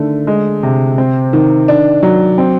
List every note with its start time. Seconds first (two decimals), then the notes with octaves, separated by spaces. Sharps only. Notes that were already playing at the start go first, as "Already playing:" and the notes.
Already playing: D3 D#3 A3
0.27 G#3
0.63 C3
0.98 C4
1.33 D#3
1.68 D4
2.03 F#3
2.38 C4